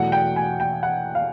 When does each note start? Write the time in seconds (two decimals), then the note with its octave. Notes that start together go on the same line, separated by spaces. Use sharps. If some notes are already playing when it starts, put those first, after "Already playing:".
Already playing: E2 B2 F#3 A3 F#5
0.12 G5
0.36 G#5
0.60 G5
0.83 F#5
1.15 F5